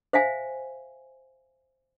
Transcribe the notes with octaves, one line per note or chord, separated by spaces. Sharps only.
C5 E5 F5 G#5